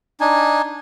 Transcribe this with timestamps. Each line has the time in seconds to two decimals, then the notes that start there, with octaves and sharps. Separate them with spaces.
0.20 D4 D#4 G#5